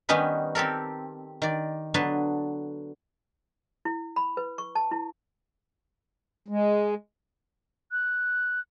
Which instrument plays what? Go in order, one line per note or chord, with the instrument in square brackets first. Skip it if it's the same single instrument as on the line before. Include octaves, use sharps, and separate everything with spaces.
[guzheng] D#3 G3 B3 C#4 D#4 B4
C4 G4 A4 A#4
D#3 D5
D3 F#3 B3 B4 A5
[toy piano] E4
B5
B4
C#6
A5
E4
[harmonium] G#3
[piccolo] F#6